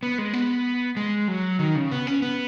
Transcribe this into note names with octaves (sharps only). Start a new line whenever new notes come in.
B3
G#3
B3
G#3
F#3
D#3
C#3
B3
C#4
B3